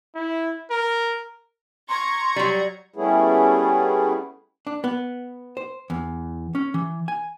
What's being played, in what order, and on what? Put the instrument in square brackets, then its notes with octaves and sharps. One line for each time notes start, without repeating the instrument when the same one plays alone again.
[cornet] E4
A#4
[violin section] A#5 C#6 G#6 [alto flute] C6
[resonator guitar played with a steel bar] F#3 G3
[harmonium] G3 A3 B3 C#4 E4 G#4
[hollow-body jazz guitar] D4
B3
C5
E2
C#4
E3
G#5